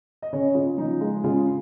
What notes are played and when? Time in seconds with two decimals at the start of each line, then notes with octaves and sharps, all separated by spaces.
0.22 D#5
0.33 C#3 C#5
0.55 C#3 F4
0.78 F3 D#4
1.01 G#3 F4
1.24 C#3 F4